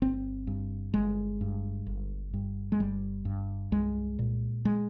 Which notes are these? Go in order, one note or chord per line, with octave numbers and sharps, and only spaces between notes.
G1 C4
G2
G1 G#3
G2
G1
G2
G#3
G1 G3
G2
C2 G#3
A#2
G#3